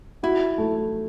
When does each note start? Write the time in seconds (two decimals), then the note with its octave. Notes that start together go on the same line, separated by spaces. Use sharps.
0.23 E4 F#4
0.58 A3